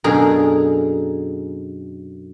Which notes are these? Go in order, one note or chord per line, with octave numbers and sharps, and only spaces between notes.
F#2 B2 D3 G#4 A#4